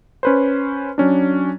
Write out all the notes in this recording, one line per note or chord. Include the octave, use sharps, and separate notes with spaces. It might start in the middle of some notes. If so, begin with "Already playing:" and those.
C#4 B4 C5
F#3 C#4 D4